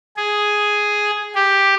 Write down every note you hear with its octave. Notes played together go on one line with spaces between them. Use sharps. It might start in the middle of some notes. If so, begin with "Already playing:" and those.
G#4
G4